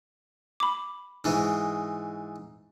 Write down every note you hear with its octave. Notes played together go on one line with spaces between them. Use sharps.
B5 D6
G#2 E3 G#3